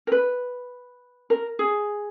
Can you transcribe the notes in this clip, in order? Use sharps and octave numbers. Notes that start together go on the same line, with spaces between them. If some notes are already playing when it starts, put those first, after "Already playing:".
A#4
B4
A#4
G#4